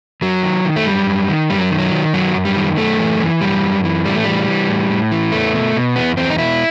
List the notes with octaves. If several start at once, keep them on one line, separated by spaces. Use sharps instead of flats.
F#2 F#3
D#3
D#3
A3
F#2 G3
F#2
D#3
F#2 G3
F#3
D#3
F#3
D#3
F#2 F#3
F#2
G3
D#3
F#2 A3
E3
E3
F#2 G3
F#2
E3
A2 G3
A3
E3 G3
E3
A2
A2
E3
E2 A3
B2
B2
E2 B3
E2 C4
D#4
B2 E4